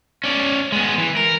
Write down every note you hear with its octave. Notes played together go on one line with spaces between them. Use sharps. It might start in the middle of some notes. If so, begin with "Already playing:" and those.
C#4 D5
G#3 B3
E3
A#4